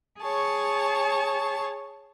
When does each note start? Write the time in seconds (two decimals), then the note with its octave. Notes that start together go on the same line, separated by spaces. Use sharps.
0.21 G#4 C#5 A5 C#6